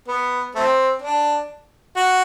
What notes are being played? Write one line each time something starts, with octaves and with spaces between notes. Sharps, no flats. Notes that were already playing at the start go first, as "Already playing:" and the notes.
B3
A3 C4
D4
F#4